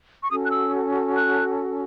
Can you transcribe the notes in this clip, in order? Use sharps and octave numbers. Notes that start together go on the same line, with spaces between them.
C#6
C#4 F#4 A4 D#6
F#6
E6
F#6